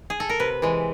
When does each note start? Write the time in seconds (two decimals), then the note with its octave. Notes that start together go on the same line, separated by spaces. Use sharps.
0.10 G#4
0.20 A4
0.29 A#4
0.40 C3 B4
0.62 E3 G#3